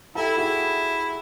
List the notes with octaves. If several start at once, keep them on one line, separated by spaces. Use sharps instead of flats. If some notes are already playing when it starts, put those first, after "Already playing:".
E4 G4 A4
E4 F#4 G#4